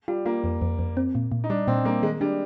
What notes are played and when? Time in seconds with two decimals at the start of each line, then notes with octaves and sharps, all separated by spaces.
0.08 G3 F4
0.26 A#3 F4
0.44 F2
0.62 F2
0.79 F2
0.97 C4
1.15 A#2
1.32 A#2
1.44 D#4
1.50 G3 D4
1.67 A#2 C4
1.85 G3 A#3
2.02 D#3 G#3
2.21 G3 D4